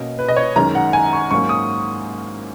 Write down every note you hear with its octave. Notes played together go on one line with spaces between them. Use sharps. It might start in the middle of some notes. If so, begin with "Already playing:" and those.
Already playing: B2 A#3 C#4 D#5
B4
D#5
C#5
F#2 D#3 G#3 C#4 A#5
F#5
G#5
C#6
G#2 F#3 A#3 C#4 C#6
D#6